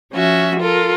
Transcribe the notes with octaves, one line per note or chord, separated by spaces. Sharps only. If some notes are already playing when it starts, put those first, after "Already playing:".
F3 C#4 F#4 E5
F4 A4 A#4